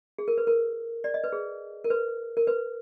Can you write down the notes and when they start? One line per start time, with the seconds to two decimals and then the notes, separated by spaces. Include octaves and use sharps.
0.18 G#4
0.28 A#4
0.38 B4
0.47 A#4
1.04 D5
1.14 D#5
1.24 B4
1.32 G#4
1.84 A#4
1.90 B4
2.37 A#4
2.47 B4